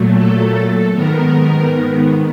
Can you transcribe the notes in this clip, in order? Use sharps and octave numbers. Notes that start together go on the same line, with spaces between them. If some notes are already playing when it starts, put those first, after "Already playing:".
Already playing: A#2 F#3 A3
A4
G#2 D#3 B3 A#4